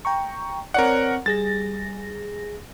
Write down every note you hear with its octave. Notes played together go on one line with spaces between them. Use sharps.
G5 A#5 C#6
C4 A#4 C#5 D5 F#5
G3 G#4 A6 A#6